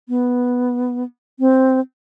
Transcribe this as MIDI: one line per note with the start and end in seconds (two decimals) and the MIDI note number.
0.09 1.04 59
1.40 1.80 60